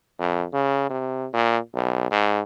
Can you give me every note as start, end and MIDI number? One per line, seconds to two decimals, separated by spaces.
0.19 0.45 41
0.53 0.89 49
0.90 1.27 48
1.33 1.58 46
1.74 2.09 35
2.11 2.42 44